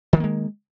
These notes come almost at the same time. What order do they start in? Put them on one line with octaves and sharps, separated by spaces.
D#3 F3 A#3 G#3